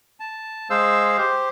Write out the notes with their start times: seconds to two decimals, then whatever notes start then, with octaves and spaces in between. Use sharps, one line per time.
0.20 A5
0.70 G#3 G#4 C5 F5 E6
1.18 G4 C5